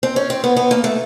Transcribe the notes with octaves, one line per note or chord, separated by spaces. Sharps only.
C4
C#4
C4
B3
B3
A#3
A3